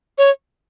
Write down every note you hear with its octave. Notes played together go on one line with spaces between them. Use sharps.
C#5